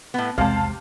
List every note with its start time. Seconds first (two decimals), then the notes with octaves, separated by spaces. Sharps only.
0.14 A2 B3
0.38 B1 E2 C3 G#3 F5 A5